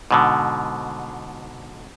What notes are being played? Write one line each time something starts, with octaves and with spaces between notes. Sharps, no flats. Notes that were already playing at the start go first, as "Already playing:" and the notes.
G#2 B2 D3